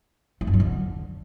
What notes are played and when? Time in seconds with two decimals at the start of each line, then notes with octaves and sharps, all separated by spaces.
0.41 A3
0.47 F#2
0.53 F#3
0.60 D3